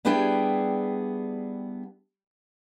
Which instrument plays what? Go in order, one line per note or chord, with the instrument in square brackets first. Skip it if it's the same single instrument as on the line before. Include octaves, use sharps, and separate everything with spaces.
[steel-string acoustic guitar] G3 B3 D4 E4 G#4 G5